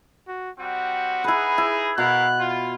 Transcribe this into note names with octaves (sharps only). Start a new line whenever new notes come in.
F#4
G3 C4 F#4 F#5
D#4 E4 G#4 B4
E4
B2 E4 A#4 F5 F#6
F4